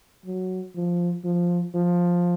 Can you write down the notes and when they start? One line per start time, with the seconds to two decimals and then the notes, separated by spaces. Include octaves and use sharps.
0.26 F#3
0.76 F3
1.25 F3
1.75 F3